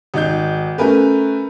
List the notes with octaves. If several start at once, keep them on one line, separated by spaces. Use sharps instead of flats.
G#1 D#4 G6
A3 C#4 A#4 B4